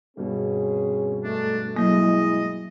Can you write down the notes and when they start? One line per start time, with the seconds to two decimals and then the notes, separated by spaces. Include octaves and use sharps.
0.17 G2 B2 C4 C#4 G#4
1.23 G#2 A3 D4
1.77 F#3 G#3 A#3 E4 D#5